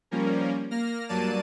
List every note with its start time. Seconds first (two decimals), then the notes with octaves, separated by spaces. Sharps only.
0.11 F3 G3 A#3 C#4 A#4
0.71 A#3 F6 A#6
1.09 G2 F#3 A#3 D5 A5 D#7